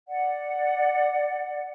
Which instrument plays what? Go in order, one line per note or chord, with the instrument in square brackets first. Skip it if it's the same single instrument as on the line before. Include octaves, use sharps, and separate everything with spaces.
[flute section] D5 F#5